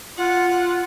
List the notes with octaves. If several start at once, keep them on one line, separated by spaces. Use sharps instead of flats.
F4 F#5